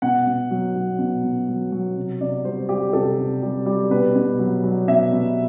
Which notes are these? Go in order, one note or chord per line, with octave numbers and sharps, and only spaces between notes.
B2 F#5
B2
F#3
F#3
B2
B2
F#3
F#3
C3
C3 D5
G3 C5
G3 G4
C3 A4
C3
G3
G3
B2 B4
B2
F#3
F#3
B2 E5
B2